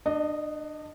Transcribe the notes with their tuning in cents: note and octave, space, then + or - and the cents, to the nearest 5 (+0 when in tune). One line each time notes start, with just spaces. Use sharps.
D4 +30 D#5 -10